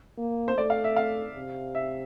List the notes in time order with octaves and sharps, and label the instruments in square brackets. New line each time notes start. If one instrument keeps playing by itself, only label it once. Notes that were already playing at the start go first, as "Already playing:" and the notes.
[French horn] A#3
[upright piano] C5
[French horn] A3 [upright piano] D5
[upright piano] F5
E5
F5
[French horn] C3
[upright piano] E5